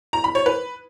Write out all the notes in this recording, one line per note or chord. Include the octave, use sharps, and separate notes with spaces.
A#5
B5
C#5
B4